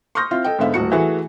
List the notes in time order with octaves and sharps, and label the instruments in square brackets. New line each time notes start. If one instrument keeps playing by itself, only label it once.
[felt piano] C6 C#6 D#6 F6 G6 A#6
C4 E4 F4
A4 D#5 G5
G#2 D3 B3 E5 F5
D#1 A2 F#4 C#7
E3 A3 E4 F#4 G#4